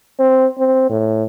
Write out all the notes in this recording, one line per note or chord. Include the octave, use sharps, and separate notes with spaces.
C4
C4
A2